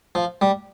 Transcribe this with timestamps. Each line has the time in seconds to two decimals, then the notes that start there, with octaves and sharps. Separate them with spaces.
0.15 F3
0.41 G3